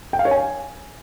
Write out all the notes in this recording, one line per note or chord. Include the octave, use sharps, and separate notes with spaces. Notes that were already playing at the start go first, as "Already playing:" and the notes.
G5
F5
C#5
G#5